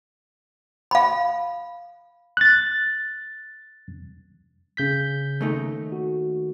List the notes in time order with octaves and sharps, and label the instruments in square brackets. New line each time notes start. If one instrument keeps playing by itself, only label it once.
[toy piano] F5 B5
[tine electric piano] F#6 A6
C#3 G6 B6
[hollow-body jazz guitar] D#2 A3 D#4
[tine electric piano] F#4